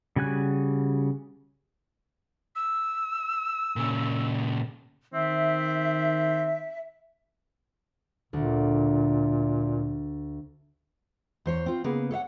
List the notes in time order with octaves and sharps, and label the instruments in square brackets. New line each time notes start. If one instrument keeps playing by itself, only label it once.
[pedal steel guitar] C#3 G3 F#4 G#5 F#6
[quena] E6
[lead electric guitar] A#2 C#3
[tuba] D#3 [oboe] C4 [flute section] E5
[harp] D2 [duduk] A#2
[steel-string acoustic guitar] E2 C5 C#5
C4 F4
C#3 A#3 B3 G#4
A4 C#5 E5 F#5